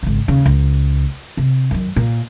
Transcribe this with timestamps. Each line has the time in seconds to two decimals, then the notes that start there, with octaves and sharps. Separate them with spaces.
0.03 G#1 C#3
0.28 D#2 C#3
0.46 C#2
1.37 C3
1.71 F#2 D#3
1.96 A#2